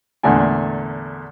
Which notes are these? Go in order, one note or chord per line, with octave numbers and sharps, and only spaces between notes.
E2 A#2 D3 A3 G#5